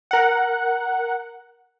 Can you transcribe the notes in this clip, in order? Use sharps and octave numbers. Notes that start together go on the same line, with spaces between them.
A#4 F#5